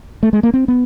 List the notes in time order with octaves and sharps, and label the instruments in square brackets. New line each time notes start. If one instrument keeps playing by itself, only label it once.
[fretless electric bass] A3
G#3
A#3
C4
B3